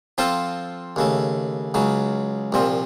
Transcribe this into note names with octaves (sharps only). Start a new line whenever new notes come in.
F3 C4 F4 A4 C5
D#2 C#3 A3
C#2 C#3 F#3
C2 A#2 F3 C4